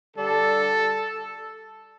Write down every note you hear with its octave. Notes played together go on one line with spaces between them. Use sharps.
D3 G3 D4 A4